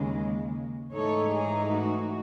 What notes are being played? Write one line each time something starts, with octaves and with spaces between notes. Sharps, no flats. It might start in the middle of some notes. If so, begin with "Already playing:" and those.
Already playing: D#2 C#3 G#3
G#2 E3 A3 D#4 A4 C#5
G#4
F#4